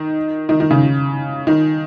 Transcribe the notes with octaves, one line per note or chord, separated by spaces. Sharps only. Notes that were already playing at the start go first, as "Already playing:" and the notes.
Already playing: D#3
D#3
D#3
C#3
D#3